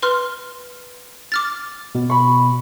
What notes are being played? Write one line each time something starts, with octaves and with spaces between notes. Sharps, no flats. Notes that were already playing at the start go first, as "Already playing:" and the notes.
B4 C6 F6
D6 F6 A6
B2
B5 C#6